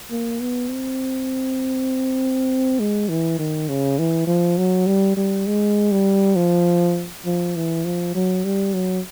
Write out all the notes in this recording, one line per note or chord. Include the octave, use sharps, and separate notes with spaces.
A#3
B3
C4
G#3
E3
D#3
C#3
E3
F3
F#3
G3
G3
G#3
G3
F3
F3
E3
F3
F#3
G3
F#3